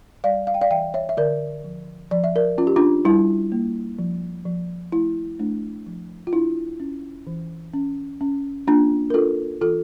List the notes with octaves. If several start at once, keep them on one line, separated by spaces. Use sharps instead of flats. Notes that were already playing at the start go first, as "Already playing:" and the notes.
G3 D5 F5
F5
G5
D5 F5
E3 E5 G5
C#5 E5
E5
D3 A#4 D5
F3
F3 D5
E5
A#4 D5
C#4 F4
G4
D4 F4
G3 E4
A#3
F3
F3
A3 E4
A3 D4
F3
F4
D4 E4
C#4
E3
C#4
C#4
A#3 D4 F4
A#4
D4 F4 A4
E3 F4 A4